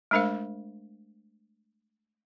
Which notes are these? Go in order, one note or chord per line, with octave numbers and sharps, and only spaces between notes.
G#3 A3 D4 A#4 C5 F5